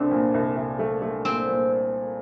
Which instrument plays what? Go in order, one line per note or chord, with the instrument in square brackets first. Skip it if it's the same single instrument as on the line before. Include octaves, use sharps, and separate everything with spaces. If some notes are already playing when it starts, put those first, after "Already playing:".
Already playing: [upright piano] C2 A3 D4 [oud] C4
[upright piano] A#2
C2
C2
A3
A3
[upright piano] A#2 [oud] C4
[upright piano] A#2